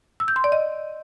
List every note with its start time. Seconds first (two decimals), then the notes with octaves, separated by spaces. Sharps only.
0.20 E6
0.28 G6
0.36 C6
0.44 D5
0.52 D#5